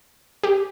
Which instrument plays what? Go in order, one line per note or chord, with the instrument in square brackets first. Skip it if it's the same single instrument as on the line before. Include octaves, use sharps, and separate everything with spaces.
[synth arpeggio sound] G4